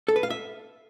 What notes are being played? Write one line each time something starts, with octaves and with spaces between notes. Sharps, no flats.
A4
B4
F5
E5